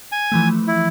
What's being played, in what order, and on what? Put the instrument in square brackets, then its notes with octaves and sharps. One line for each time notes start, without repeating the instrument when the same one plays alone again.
[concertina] G#5
[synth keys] E3 F3 A3
[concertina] E4